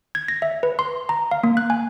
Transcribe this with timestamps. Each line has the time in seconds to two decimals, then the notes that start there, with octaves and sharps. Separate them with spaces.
0.15 G#6
0.28 A#6
0.42 E5
0.63 B4
0.79 C6
1.09 A#5
1.31 F5
1.44 A#3
1.57 F#6
1.70 G#5